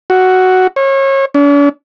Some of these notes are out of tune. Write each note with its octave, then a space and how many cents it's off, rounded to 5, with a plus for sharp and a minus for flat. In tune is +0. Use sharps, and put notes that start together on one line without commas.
F#4 +5
C#5 -30
D4 -45